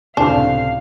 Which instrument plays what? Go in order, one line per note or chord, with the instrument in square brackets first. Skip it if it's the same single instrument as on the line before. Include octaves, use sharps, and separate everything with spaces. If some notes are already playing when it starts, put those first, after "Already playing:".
[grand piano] C#2 A2 C3 [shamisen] D4 [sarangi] F5